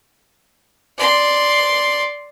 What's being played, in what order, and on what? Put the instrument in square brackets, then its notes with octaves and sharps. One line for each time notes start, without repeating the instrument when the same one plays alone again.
[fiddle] D5 C6